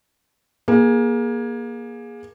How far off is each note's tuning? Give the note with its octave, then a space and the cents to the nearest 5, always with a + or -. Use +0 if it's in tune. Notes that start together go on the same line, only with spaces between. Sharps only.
A#3 +25 G#4 -5